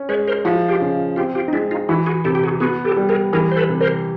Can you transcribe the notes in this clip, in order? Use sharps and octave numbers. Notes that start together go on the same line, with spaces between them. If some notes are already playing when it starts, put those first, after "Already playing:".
Already playing: C#4
G#3 B4 C#5
A#4 C5
F3 E4 F#4
F4 G4
C#3
C4 F4 G4
F4 G4
D#4
G#3 D4 E4
D#4 F4
E3 E4 F#4
F#4 G#4
C3 G4 A4
G4
F#4 G#4
B3 F#4 G#4
G4 A4
G3
G#4 A#4
E3 G#4 A#4
C5
A4 B4
C3
A#4 C5